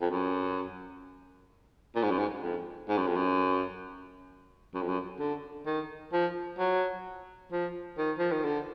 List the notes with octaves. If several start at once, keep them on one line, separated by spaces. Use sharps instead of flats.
F2
F#2
A#2
G#2
F#2
G#2
F2
G#2
F#2
F2
F#2
F#2
F2
F#2
D3
D#3
F3
F#3
F3
D#3
F3
D#3
D3